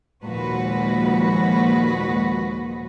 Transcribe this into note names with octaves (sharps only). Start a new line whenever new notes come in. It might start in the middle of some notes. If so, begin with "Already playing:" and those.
D#2 A#2 F3 G#3 F#4 B4